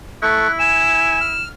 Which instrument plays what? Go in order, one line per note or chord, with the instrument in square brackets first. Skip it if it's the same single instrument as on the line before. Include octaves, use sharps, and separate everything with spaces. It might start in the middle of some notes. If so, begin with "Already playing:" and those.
[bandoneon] A3 A4 C#6 [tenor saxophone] E4 [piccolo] F#6
[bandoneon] G#5 [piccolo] E7
[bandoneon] F6